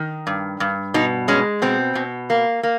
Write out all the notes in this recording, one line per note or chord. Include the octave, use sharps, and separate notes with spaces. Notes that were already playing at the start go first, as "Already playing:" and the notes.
Already playing: D#3
G2
G2
B2 D#4
G#3 C#4
B2 C4
B2
A#3
A#3